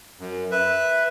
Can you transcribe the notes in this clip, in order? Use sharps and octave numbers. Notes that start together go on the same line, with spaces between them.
F#2
B4 E5